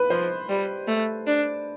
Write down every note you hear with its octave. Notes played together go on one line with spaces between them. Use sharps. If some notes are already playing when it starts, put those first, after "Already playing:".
Already playing: B4
F3 C5
G3
A3
D4